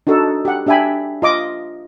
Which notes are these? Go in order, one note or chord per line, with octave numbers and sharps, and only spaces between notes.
D4 D#4 F#4 A4
G4 F#5
D4 G4 E5 G5 G#5 B5
F4 D#5 D6